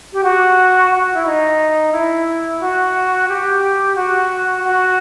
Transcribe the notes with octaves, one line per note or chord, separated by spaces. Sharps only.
G4
F#4
F#4
E4
D#4
E4
F#4
G4
F#4
F#4